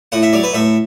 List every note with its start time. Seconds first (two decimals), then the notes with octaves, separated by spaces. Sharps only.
0.12 A2 F#5
0.23 E5
0.33 F#3 D5
0.43 B4
0.54 A2 E5